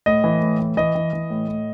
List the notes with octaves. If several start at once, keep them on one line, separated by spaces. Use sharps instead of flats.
A2 D#5
E3
A2
E3
E3 D#5
E3
E3
A2
A2